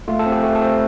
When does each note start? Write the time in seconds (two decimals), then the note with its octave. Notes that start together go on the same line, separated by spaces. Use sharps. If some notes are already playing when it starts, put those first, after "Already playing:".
0.08 A3 F4
0.19 A4
0.26 C4
0.32 G4
0.44 A3
0.55 A4
0.62 C4